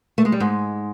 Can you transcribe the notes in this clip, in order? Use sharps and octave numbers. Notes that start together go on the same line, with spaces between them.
A3
G#3
G3
G#2 G#3